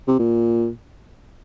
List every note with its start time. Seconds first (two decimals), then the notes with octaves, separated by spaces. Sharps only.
0.08 C3
0.19 A#2